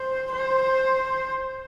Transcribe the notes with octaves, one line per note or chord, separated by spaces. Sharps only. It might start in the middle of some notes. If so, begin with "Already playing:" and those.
Already playing: C5
C5